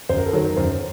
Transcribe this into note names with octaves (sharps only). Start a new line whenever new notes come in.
F#2 C5
A#4
A4
D#3 F#3 A#4
F#2 C5